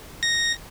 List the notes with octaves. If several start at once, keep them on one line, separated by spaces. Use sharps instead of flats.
A#6